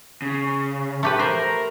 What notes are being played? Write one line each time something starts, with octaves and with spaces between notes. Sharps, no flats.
C#3
A3 G4 B4
A#4 C5